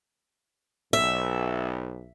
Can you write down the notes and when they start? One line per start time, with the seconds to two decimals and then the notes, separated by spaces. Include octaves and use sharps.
0.93 B1 E5